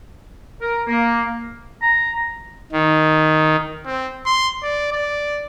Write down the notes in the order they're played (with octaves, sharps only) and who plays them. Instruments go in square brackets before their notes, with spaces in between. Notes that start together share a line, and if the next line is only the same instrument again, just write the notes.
[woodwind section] A#4
A#3
[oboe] A#5
[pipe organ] D#3
[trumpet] C4
C6
D5
D5